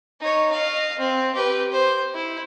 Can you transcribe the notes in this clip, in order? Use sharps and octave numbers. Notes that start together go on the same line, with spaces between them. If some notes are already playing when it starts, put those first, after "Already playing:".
D#4 C#5
D#5 F5
C4
G4 B4
C5
E4